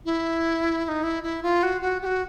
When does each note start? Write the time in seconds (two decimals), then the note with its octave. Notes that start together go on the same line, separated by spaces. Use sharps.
0.05 E4
0.85 E4
0.88 D#4
1.03 E4
1.23 E4
1.43 F4
1.63 F#4
1.82 F#4
2.02 G4
2.06 F#4